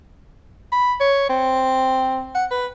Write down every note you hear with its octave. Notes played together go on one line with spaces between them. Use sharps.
B5
C#5
C4
F#5
B4